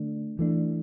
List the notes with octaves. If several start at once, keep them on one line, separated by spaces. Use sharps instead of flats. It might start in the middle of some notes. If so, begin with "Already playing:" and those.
Already playing: D3 A3 D4
E3 A3 D4